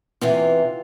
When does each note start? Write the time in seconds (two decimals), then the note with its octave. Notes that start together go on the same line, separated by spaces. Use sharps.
0.21 E2 C3 E3 F4